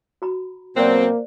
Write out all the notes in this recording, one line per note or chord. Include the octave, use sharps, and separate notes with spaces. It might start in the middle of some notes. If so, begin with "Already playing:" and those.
F#4 A#5 B5
B2 F#3 A#3 C4 C5 D5